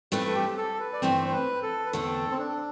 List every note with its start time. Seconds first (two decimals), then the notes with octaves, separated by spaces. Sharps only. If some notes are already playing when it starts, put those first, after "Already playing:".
0.12 G2 E3 A3 C4 B4
0.26 A4
0.35 G4
0.57 A4
0.80 B4
0.93 D5
1.02 G2 E3 A3 C4 C5
1.28 C5
1.33 B4
1.62 A4
1.86 B4
1.93 E2 D3 A3 C4 A4
2.30 C4
2.39 D4